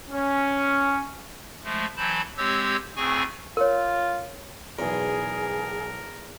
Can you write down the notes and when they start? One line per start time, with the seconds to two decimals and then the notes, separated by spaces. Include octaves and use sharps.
0.11 C#4
1.64 F3 G#3 A3
1.97 E3 F#3 A5 B5 G6
2.37 G#3 C4 G4 C#5 E6 G6
2.96 D2 A2 C4 G#4 G#5 C#6
3.57 F4 A#4 C#5
4.79 B1 E2 G#4 A#4 B4